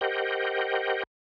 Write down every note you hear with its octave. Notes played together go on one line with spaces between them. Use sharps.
G4 A#4 C5 D#5 F#5 G5